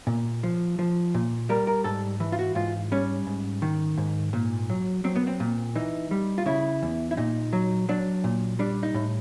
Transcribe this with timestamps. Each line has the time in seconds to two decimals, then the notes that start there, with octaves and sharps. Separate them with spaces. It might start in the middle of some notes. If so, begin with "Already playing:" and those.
0.07 A#2
0.43 F3
0.79 F3
1.14 A#2
1.49 G3 A#4
1.67 A#4
1.84 G#2 A4
2.20 E3
2.32 F4
2.39 F#4
2.55 G#2 F4
2.92 G3 C#4
3.27 G#2
3.62 D#3
3.98 G#2
4.33 A#2
4.69 F#3
5.04 F#3 C4
5.16 B3
5.27 C4
5.40 A#2
5.75 E3 D#4
6.11 G3
6.38 F4
6.46 C#3 E4
6.82 E2
7.11 E4
7.17 A#2 D#4
7.53 F#3
7.89 F#3 D4
8.24 A#2
8.59 G3 D4
8.83 D#4
8.94 A2